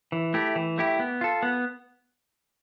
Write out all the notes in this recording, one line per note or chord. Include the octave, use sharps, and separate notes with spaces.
E3
A3 E4 G4
E3
A3 E4 G4
B3
F4 A4
B3